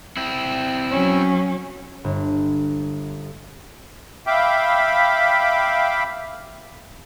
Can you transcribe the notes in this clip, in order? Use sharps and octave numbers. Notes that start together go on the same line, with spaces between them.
C4 E4
F#3 C#4
G1
E5 F5 G5 B5 D6